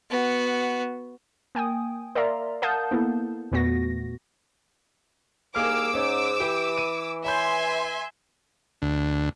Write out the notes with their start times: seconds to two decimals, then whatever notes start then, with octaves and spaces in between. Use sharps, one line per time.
0.10 B3 F#4
1.55 A#3 G5 G#5 D#6
2.15 A#4 D5 E5 F5 A#5 C6
2.62 A#4 F5 F#5 A5 D#6 G6
2.91 A#3 B3 E4 A4
3.52 E2 A#2 A3 B3 F#4 A#6
5.56 C2 D#3 A#3 G#4 D6 E6 F6
5.94 G#2 C#4
6.40 E3 G4
6.78 D#7
7.24 C#5 E5 G#5 B5 C6 G6
8.82 D2